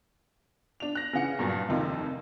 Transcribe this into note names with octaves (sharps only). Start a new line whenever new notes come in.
D4 F7
F#6 A#6
C#3 E3 F#5 C#7
G2 A#2 F#3
F1 D#2 C3 D#4 F4